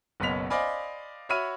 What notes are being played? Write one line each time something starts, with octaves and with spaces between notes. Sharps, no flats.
F#1 B1 B3 C#4 B6 F7
C5 D5 D#5 F5 G#5 B5
F#4 C#5 E5 B5 F6 D#7